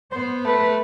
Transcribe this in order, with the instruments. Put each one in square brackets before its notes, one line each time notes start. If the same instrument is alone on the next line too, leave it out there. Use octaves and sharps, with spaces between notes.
[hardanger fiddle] B3 [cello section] C5
[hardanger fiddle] A3 [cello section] B4